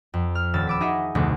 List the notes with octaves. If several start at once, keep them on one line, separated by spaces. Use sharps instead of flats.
F2
F6
D#1 E6 A6
B5 D6 E6
D#4 F#4 G#4 D#5 E5 G#5
F1 D2 B2 A3 D4